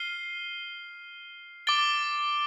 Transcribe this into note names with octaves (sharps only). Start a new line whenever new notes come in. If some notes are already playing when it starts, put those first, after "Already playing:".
Already playing: F6 C7 D#7 G7
D6 A6 D7 G7